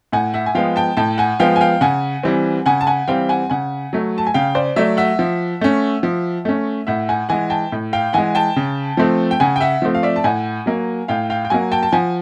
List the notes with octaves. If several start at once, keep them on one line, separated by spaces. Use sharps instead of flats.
A2 F#5 G#5
E5 F#5
G#5
F3 G#3 B3 F5 G5
G5 A5
A2 G5 A5
F#5 G#5
F3 G#3 B3 F5 G5
G#5
F5 G5
C#3 F#5 G#5
E3 G3 C4
C#3 F#5 G#5
A5
F#5 G#5
E3 G3 C4 F5 G5
F#5 G#5
C#3 F#5 G#5
F#3 A3
A5
G#5
C#3 F5 G5
C5 D5
F#3 A3 D5 E5
E5 F#5
F3
A3 C#4
F3
A3 C#4
A2 E5 F#5
F#5 G#5
E3 G#3 F#5 G#5
G5 A5
A2
F5 G5
E3 G#3 F#5 G#5
G5 A5
C#3
F3 A3 C4
G5
C#3 F#5 G#5
G5
E5 F#5
F3 A3 C4
F5
D5 E5
A5
A2 F#5 G#5
F#3 A#3
A2 F5 G5
F5 G5
G5
F#3 A#3 F#5 G#5
G5 A5
A5
F3 F#5 G#5